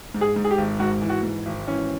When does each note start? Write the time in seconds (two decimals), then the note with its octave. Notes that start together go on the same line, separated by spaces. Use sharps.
0.14 G#2
0.21 G#4
0.36 G#2
0.44 G#4
0.51 G4
0.58 G#1
0.80 G#2 F#4
1.02 E3
1.10 F#4
1.23 G#2
1.46 G#1
1.68 E3 C#4